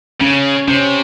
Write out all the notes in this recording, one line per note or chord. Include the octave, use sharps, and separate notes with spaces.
C#3 C#4
C3 C#4